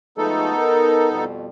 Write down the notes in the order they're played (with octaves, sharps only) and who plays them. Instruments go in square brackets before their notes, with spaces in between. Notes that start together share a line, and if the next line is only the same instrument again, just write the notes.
[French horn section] F3 G#3 A3 [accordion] B3 D#4 A4
[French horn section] A#4
F2 B2 G3